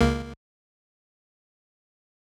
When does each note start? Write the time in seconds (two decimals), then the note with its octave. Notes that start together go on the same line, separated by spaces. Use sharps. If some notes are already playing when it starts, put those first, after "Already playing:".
0.01 C#2 A#3